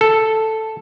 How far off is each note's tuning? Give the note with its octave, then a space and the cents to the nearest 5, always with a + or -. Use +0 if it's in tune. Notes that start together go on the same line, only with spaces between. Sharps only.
A4 +0